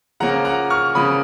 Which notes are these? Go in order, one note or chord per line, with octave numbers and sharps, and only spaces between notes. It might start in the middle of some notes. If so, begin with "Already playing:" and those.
C#3 F3 A#3 C#4 F#5 A#5
F#5 A#5
C#6 F6
C#3 F3 A#3 C#4 B5 D#6